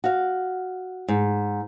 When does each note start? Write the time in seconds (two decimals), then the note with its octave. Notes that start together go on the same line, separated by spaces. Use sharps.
0.04 F#4 F5
1.08 G#2